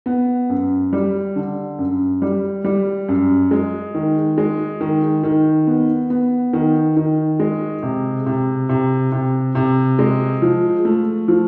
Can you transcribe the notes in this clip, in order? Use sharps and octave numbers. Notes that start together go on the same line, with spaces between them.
B3
F#2
G3
D3
F#2
G3
G3
F#2
G#3
D#3
G#3
D#3
D#3
B3
B3
D#3
D#3
G#3
C3
C3
C3
C3
C3
G#3
F3
A3
F3